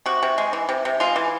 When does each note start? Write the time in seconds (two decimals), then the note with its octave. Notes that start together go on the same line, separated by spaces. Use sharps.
0.06 C3 F#4
0.23 C3
0.38 G#3
0.53 E3
0.69 C3
0.85 C3
1.00 G#3 F4
1.16 E3